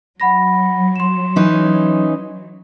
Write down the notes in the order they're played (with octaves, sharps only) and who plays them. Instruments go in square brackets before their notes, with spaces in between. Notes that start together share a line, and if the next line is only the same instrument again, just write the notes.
[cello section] F#3 [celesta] F#5 B5 A#6
[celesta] C6 E7
[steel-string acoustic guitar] E3 C#4 D#4